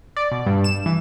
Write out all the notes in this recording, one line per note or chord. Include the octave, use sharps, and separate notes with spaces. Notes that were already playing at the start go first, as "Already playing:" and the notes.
D5
B2
G2
E7
E3